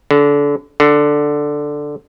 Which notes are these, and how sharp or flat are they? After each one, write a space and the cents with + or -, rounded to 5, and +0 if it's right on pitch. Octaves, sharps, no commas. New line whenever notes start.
D3 -25
D3 +5